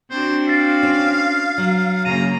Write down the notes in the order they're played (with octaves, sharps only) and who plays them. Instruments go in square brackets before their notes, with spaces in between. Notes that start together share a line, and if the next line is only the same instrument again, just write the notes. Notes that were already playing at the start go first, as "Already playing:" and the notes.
[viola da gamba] C4 D4 F#4 [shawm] C5
[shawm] F5 [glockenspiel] A6 C7
[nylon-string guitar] C#4
F#3
[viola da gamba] F#2 C#3 A#3 [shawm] A#5 [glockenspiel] D#7